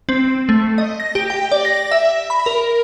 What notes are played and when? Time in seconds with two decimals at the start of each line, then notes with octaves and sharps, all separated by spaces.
0.09 C4
0.49 A3
0.78 D#5
1.00 A#6
1.15 G4
1.30 G5
1.52 D5
1.65 A#6
1.91 E5
2.30 B5
2.46 A#4